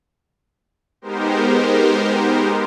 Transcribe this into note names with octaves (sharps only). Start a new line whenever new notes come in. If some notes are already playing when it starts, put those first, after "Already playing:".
G#3 B3 D#4 G4 A#4 C5